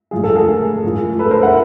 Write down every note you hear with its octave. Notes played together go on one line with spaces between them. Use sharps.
A2 F3 G#3 G#4
A4
G#4 A#4
A2 F3 G#3
A4 B4
A#4 C5
E5 F#5